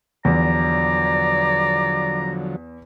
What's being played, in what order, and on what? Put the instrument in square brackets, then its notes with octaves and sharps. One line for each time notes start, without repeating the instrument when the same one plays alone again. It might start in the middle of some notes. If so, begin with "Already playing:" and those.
[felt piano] E2 [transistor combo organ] D3 F3 F#3 [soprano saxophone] D5 [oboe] A#5